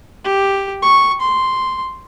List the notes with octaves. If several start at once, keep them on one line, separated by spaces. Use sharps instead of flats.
G4
C#6
C6